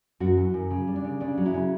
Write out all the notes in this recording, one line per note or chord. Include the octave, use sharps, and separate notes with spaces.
F#2 F#4
E3
F#2
C#3
G3
D4
C#3
C#3 D4
F#3
E4
C#3